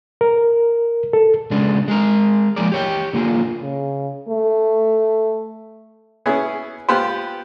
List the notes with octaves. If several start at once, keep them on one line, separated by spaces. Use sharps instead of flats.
A#4
A4
C#3 G#3 B3 D4
G#3 G#4 A#4
F3 G#3 A#3 G#4 A#4 D5
G4 C#5 G5
D3 A#3 F4 G#4
C#3
A3
B3 C#4 E4 G#4
B3 F4 G4 B4 C5